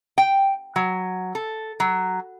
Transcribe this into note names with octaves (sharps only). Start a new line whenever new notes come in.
G5
F#3
A4
F#3